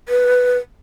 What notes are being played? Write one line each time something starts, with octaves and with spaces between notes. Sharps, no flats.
B4